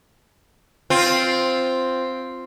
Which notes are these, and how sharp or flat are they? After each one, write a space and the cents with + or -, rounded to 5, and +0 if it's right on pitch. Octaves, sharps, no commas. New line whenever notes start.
C4 +0 F4 +0